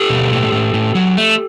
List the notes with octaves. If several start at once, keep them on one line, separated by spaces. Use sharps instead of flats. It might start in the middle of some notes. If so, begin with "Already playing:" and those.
Already playing: G4 A4
B2
A2
A2
A2
F#3
A3